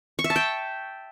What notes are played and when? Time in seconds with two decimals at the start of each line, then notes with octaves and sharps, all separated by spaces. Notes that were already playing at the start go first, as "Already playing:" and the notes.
0.19 C#6
0.24 E5
0.30 A5
0.36 G5